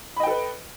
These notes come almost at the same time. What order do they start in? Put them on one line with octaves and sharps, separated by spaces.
B5 D#5 G5 A4 B4